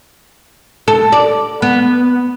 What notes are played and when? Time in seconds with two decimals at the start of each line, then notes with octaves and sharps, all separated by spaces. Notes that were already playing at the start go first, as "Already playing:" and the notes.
0.88 A4
1.12 D5
1.62 B3